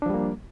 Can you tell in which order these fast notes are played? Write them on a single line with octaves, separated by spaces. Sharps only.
D4 F3 G3 A#3